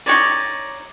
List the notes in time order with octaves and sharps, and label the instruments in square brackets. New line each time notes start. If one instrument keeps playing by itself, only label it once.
[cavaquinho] D#4 F#4 C#5 D5